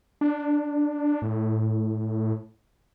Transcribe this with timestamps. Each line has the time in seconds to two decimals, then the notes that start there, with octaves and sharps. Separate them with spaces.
0.21 D4
1.22 A2